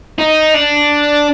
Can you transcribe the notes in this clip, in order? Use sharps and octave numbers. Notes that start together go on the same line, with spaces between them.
D#4
D4